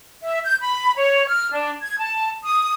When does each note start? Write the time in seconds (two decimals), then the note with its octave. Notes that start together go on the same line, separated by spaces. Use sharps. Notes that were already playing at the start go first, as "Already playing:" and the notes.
0.24 E5
0.45 G6
0.61 B5
0.96 C#5
1.28 F6
1.52 D4
1.81 G#6
1.99 A5
2.44 D#6